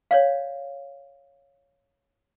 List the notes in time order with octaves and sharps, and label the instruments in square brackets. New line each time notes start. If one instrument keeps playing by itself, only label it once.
[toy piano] C#5 D5 F5